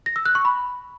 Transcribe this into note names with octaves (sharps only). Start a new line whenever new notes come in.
A#6
E6
F#6
C#6
B5